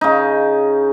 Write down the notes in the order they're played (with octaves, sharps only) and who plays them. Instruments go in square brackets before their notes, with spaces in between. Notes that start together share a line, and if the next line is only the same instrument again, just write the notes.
[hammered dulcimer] C#3 D#4